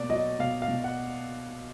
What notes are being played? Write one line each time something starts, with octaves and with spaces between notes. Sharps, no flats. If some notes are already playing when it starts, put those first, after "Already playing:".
Already playing: B2 A#3 D5
F#3 D#5
B2 F5
F5
B2
F#5